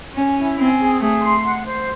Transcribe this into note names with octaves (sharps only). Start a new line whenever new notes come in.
C#4 G#5
E4
C4 G#5
G#4
A3 G#4
C6
F#5
C5